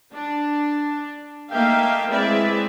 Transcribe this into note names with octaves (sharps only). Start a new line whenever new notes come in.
D4
A3 A#3 D#4 E5 F5 G5
G#3 C4 E4 B4 D5 E5